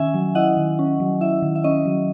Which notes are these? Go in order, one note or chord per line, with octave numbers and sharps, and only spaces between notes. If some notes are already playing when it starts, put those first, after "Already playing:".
Already playing: D#3 C#4 E5 G#5
F#3
E4 D#5 F#5
D#3
C#4
F#3
E4 E5
D#3
E5
C#4 D#5
F#3